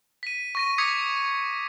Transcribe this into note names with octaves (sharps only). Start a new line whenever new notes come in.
B6 D#7
C#6 A#6 D#7
D6 D#6 G#6 B6 C#7